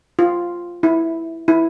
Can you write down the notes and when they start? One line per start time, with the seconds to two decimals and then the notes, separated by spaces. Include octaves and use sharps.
0.19 F4
0.83 E4
1.48 E4